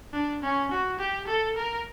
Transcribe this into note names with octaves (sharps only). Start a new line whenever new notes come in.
D4
C#4
F#4
G4
A4
A#4